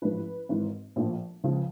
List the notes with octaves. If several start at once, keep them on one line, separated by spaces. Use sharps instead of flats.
A1 G#2 F3 B4
G#1 G#2 E3
A#1 A2 F3
C#2 C#3 F3